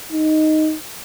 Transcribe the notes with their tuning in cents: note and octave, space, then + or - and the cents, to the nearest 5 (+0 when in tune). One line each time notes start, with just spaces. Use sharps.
D#4 +0